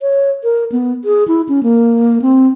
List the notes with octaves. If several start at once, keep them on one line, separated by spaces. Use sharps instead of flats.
C#5
A#4
B3
G#4
E4
C#4
A#3
C4